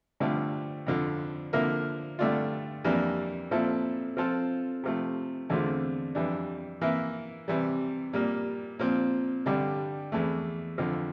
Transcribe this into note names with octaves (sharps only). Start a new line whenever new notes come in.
G2 D3 F3 A3
F2 D3 F3
D3 F3 A#3 E4 A#4
G2 D3 A3 D4 F4
F2 E3 G3 A#3 D4
A#2 F3 C4 E4 A4
F3 C4 F4 A4
C3 F3 A3
E2 D3 A3 C4 F4
F2 E3 G3 D4
E3 A#3 E4
C3 E3 G3
A#2 G3 A#3
A#2 F3 C4
G2 D3 G3
E2 E3 A3
F2 D3 F3